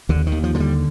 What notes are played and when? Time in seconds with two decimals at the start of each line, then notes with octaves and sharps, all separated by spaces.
0.09 D#2 D3
0.27 D#3
0.32 D#2
0.44 F3
0.54 D3 F3
0.60 G3